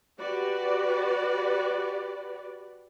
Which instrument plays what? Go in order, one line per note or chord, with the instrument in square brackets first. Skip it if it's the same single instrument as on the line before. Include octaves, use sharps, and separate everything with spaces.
[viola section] F#4 G4 B4 D5